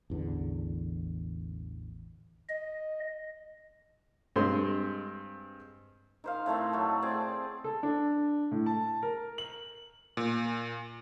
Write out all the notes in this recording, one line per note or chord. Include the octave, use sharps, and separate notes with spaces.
A1 E2 D3
D#5
G2 G#3 C4 C6
D#3 C5 F5
A2 D#3 A3 C4
F#3 A3
C4 G#4 D5
A4
D4
A2
A5
A#4
F#7
A#2